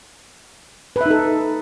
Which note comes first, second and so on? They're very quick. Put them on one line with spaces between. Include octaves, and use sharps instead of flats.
B4 E5 D#4 A4